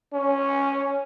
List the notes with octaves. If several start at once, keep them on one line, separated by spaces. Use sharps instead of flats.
C#4